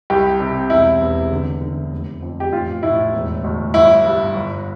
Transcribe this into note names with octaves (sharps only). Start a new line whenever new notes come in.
C2 G4
C3
E1 E4
E2
D3
D3
F1
F2
G4
A1 F4
A2 E4
E1
D2
G1 E4
G2
G1